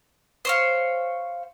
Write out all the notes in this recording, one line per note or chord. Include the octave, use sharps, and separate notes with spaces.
C5 C#5 F5